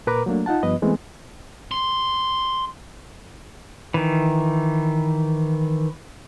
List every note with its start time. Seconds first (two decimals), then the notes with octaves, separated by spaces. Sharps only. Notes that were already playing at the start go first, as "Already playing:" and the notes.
0.07 A#2 A#4 B4 A#5 D6
0.26 F#3 A3 A#3 D4
0.46 D#4 F4 F#5 A5
0.63 G2 F3 B3 B4 D#5
0.82 E3 G#3 A3 B3 C4
1.71 C6
3.94 D#3 E3